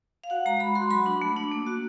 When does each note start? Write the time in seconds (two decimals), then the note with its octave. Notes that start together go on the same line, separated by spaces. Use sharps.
0.24 F5
0.30 F#4 F#5
0.46 G#3 A#5
0.60 G#3 B5
0.75 F#4 C6
0.91 F#3 B5
1.06 D4
1.22 A3
1.36 D4
1.51 A#3
1.67 F#4